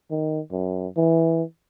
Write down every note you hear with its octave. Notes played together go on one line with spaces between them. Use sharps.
D#3
F#2
E3